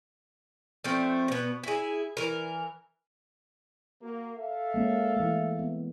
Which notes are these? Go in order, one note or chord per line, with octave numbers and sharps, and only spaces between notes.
F3 A3 C4
B2 B3
E4 G#4
E3 A#4
A#3 F#4
A4 E5 F5
G#3 A#3 C#4
E3 A3
B3